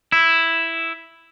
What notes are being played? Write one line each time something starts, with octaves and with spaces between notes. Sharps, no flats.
E4